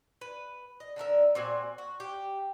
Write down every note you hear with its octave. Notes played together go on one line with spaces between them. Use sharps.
B4
D#5
D3 D4 A#4 E5
A#2 C4 F#4 G#5
F#4
G4